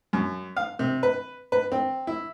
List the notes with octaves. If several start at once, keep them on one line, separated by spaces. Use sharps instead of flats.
F#2
F5
C3
B4
B4
C4
E4